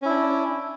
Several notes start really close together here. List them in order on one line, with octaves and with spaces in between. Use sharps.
C#4 E4 D4